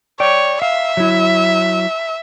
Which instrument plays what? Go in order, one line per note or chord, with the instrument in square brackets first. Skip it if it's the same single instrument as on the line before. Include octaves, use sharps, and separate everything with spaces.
[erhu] C#5 [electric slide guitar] D5 G5
[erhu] E5 [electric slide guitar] F5
[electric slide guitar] F#3 E4